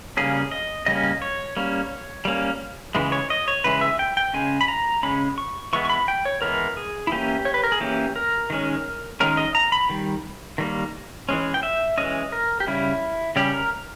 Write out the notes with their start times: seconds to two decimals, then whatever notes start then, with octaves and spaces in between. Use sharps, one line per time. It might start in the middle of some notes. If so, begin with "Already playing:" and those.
0.17 C#3 G3 A#3 C#4 G#4
0.51 D#5
0.86 C#3 G3 A#3 C#4 D#5
1.22 C#5
1.57 G3 A#3 C#4
2.25 G3 A#3 C#4
2.95 C#3 E3 G#3
3.12 C#5
3.30 D#5
3.48 C#5
3.64 C#3 E3 G#3 B4
3.81 E5
3.99 G5
4.17 G5
4.34 C#3 G#3 C#4 G#5
4.61 B5
4.68 A#5
5.03 C#3 G#3 C#4 B5
5.38 C#6
5.73 E3 G#3 B3 C#6
5.85 C#6
5.90 B5
6.08 G5
6.25 C#5
6.42 E3 G#3 B3 A#4
6.77 G#4
7.07 E4
7.12 E3 A#3 C#4 G4
7.45 C#5
7.54 B4
7.64 A#4
7.72 G#4
7.80 E3 A#3 C#4 G4
8.16 A#4
8.50 D#3 G#3 C#4
9.20 D#3 G#3 C#4 A#4
9.37 D#5
9.55 A#5
9.72 B5
9.89 D#3 G3
10.58 D#3 G3 A#3
11.29 E3 G#3 C#4
11.54 G5
11.63 E5
11.98 E3 G#3 C#4 D#5
12.32 A#4
12.60 G4
12.67 C#3 G3 C#4 E4
13.36 C#3 G3 C#4 G4
13.53 A#4